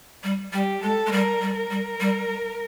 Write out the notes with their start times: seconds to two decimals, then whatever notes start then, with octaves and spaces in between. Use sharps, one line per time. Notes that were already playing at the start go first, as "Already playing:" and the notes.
0.24 G3
0.53 G3 G4
0.83 G#3 A4
1.07 G#3
1.12 G3 A#4
1.41 G3
1.55 A#4
1.71 G3
2.00 G3